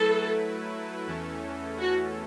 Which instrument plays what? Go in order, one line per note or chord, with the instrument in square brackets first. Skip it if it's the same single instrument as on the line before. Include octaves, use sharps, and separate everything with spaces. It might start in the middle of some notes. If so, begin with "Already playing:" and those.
Already playing: [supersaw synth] F#3 A3 E4 B4 [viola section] A4
[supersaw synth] E2 E3 A3 C#4 A4
[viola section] F#4